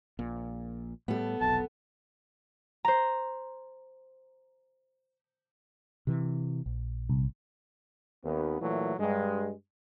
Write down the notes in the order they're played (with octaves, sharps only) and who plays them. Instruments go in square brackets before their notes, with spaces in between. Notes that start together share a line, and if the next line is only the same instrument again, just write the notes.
[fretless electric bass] A#1 A#2
[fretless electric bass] A2 G3 [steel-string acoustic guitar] B3 A4
[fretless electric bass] F1 B1 [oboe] A5
[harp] C5 A#5
[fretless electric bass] C3 E3
A#1
[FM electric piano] C2
[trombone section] D#2 B3
A#2 E3 F#3 A3
G2 G#3